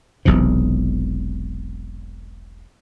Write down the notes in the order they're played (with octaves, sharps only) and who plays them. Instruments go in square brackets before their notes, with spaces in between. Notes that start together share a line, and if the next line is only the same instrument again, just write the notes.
[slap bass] E1 B1 E2 C3